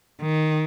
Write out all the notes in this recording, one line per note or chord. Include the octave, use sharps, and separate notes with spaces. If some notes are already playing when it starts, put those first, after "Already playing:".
D#3